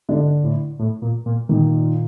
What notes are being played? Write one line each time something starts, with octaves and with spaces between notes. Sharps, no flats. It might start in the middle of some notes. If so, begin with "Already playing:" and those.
G#2 D3 D4
A2
A2
A#2
A#2
A#2 D#3 D#4